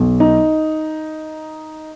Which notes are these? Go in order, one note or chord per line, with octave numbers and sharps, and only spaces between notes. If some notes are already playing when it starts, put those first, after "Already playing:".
Already playing: B1 B2
D#4